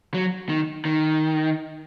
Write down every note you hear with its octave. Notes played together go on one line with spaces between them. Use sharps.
F#3
D#3
D#3